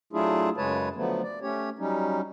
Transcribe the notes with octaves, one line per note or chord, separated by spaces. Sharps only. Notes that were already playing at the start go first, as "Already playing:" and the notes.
F#3 A3 D4 E4 F4 G#4
F#2 C#3 G#3 B4 C#5 A5
D3 F3 F#3 A3 B3
D5
A3 C#4 G4 C#5
F#3 G3 C#4 D#4